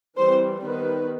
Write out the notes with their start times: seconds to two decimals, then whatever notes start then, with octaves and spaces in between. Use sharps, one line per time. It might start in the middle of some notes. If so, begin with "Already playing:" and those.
0.18 E3 G3 C4 C5
0.62 D#3 G3 B3 B4